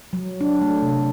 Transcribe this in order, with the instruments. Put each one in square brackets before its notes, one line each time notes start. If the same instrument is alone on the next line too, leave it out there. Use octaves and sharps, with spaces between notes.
[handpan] F#3
D4
A3
C3